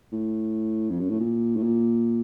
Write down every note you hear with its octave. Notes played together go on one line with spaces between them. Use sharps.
A2
F2
F#2
A2
A#2
A2
A#2